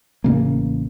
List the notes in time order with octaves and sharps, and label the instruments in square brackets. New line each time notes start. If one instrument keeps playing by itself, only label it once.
[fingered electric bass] A1 C#3 A#3